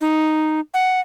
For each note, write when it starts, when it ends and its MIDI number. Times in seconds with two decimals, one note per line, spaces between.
0.01 0.60 63
0.74 1.01 78